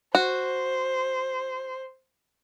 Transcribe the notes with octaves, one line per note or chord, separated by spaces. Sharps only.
F#4 C5